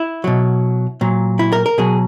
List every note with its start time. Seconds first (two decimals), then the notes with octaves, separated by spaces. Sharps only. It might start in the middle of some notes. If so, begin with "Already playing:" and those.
Already playing: E4
0.24 B2 F#3
1.01 A#2 F#3
1.39 E4
1.53 A#4
1.66 A#4
1.78 B2 F#3 G#4